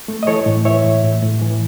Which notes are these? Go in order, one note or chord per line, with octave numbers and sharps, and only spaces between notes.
A3
D#5
E3 A4 C#5
A2
E3 C#5 E5
A2
A2
A2
E3